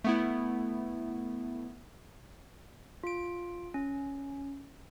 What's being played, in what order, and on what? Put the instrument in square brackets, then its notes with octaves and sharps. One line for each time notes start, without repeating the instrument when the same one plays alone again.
[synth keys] A3 B3 E4
[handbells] F4 D7
C#4